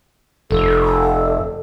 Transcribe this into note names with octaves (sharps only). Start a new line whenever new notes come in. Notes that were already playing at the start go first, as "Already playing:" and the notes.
F1 A4